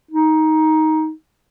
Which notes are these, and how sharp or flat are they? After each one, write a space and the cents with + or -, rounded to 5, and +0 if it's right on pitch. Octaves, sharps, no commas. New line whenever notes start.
D#4 +10